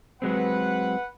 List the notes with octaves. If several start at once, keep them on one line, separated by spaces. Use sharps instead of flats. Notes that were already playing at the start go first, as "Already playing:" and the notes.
F#3 G#3 C4 B4 F#5